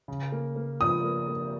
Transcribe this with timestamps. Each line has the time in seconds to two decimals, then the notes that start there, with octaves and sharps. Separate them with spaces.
0.08 C#3
0.32 A#3
0.56 A#3
0.80 F3 D#6
1.04 A#3
1.28 A#3